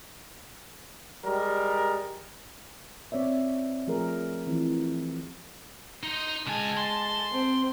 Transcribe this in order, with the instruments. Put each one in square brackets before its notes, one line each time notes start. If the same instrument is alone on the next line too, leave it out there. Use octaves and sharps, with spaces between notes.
[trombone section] G3 G#3 A#4
[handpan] C4 C#5 D5 E5
F3 A3 G#4 A#4
E3 C4
[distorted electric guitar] D#4 [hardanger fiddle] C6
[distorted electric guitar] C#2 G#5 [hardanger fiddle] G#3 A5
[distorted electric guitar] C6
[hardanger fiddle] C4